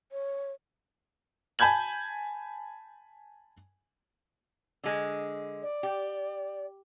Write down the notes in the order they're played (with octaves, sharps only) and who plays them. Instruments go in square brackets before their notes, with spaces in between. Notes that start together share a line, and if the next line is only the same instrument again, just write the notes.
[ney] C#5
[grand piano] G#5 A5 B5 G6 G#6 F#7
[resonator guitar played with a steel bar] D3 G#3
[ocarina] D5
[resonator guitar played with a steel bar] G4